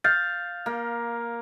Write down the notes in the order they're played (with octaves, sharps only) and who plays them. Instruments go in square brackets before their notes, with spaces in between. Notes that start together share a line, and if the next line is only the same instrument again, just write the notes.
[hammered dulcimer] F5 [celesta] F6 G6 A6
[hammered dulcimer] A#3